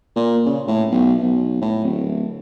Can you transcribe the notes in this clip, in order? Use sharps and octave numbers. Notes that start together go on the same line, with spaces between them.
A#2
C#3
A2
B1
B1
A2
D1